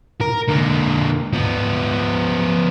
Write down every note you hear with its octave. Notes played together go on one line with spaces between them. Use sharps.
A#4
D3 A#3
F3 B3